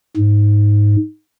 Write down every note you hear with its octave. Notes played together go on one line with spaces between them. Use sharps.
G#2